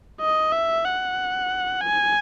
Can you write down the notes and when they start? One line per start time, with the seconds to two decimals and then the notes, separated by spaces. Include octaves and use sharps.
0.21 D#5
0.52 E5
0.85 F#5
1.81 G#5